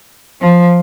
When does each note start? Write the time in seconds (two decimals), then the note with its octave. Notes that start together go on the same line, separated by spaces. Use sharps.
0.42 F3